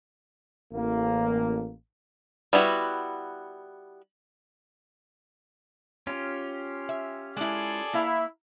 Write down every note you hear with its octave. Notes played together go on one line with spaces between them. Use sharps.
A1 A#3
G3 B3 E4 F#4
C#4 F4 G4
E5
G#3 E4 G#4 A4 D5
A#3 E4 F5